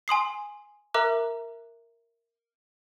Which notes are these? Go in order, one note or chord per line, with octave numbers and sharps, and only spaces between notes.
G#5 C6 D#6 C7
A#4 E5 A#5 D6 F#6